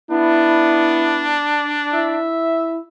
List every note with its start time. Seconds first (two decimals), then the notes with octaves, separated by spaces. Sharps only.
0.11 B3 D4 E4
1.94 E4 E5